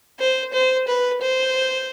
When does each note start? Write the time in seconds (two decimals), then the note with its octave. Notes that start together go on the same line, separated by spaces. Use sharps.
0.19 C5
0.53 C5
0.88 B4
1.22 C5